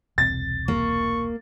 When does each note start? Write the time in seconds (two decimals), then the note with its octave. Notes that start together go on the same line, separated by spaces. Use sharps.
0.18 E1 C2 C4 A6
0.68 A#3 C#6